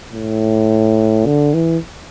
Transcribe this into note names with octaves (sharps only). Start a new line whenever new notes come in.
A2
D3
E3